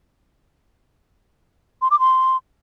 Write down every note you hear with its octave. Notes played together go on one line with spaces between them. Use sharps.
C6
D6
C6